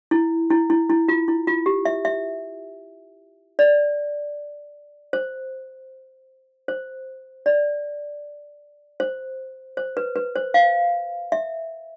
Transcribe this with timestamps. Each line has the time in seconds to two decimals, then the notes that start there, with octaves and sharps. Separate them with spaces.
0.11 E4
0.50 E4
0.70 E4
0.90 E4
1.08 F4
1.28 E4
1.47 F4
1.66 G4
1.85 E5
2.05 E5
3.59 D5
5.13 C5
6.68 C5
7.46 D5
9.00 C5
9.77 C5
9.97 B4
10.16 B4
10.36 C5
10.54 F5
11.32 E5